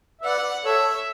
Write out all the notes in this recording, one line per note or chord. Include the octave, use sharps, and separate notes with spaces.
E5
B4 D5 F#5
A4 C#5 E5